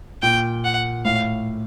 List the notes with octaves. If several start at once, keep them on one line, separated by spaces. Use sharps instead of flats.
A#2 G5
F#5
A2 F5